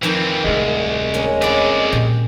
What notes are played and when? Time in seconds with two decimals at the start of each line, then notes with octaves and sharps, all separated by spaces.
0.03 F2 D#3 E3 C4 A#5
0.44 D1 C2 G#3 A3
1.14 A#3 C#4
1.42 F2 C#4 E4 D5
1.92 A#2 G4